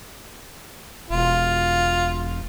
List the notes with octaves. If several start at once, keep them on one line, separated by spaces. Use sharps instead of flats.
E1 F4